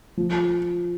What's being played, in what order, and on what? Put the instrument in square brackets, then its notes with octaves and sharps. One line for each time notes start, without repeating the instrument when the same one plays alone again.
[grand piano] F3